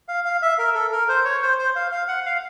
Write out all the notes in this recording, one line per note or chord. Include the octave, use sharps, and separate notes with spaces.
F5
F5
E5
A#4
A4
A#4
C5
C#5
C5
C5
F5
F5
F#5
F5